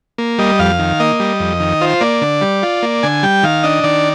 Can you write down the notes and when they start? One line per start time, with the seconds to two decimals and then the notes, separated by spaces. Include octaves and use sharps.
0.18 A#3
0.38 G3 D#5
0.59 F2 F5
0.79 D#3
1.00 A#3 D#5
1.20 G3
1.40 F2
1.60 D#3
1.81 F4 C5
2.01 A#3 D5
2.21 D3
2.41 G3
2.63 F4
2.83 A#3
3.03 D3 G#5
3.23 G3 G5
3.43 D#3 F5
3.63 D4 D#5
3.84 D#3 D5